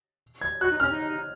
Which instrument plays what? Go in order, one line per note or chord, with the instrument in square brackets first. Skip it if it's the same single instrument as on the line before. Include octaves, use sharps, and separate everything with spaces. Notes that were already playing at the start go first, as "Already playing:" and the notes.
[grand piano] G#6
[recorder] F#4 [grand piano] F#6
[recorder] D#4
[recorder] C#4 [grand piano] F6
[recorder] D#4